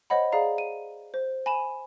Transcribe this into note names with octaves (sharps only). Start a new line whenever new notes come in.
C5 C#5 D#5 F#5 B5
G#4 D5 F5 A#5
D#7
C5
G#5 B5 D#7 E7